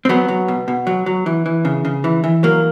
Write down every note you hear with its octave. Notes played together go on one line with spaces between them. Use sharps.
C4
F#3 B3
F#3
B2
B2
F#3
F#3
E3
E3
C#3
C#3
E3
E3
F#3 A#3